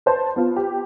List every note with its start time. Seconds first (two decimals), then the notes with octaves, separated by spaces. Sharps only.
0.06 B4 C5 A5
0.36 B3 F4
0.56 G4